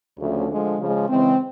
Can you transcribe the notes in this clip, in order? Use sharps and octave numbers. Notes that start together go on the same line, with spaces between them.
D2 C#3 F3 A3 C#4
D3 F3 G#3
C#3 F3 G#3
C#3 E3 G#3 C4